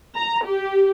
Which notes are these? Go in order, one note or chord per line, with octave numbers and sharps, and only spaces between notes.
A#5
G4